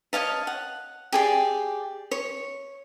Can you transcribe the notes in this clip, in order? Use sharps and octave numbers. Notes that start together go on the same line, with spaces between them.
C#5 D#5 F5 A5
F#5
G4 G#4 D5
C#5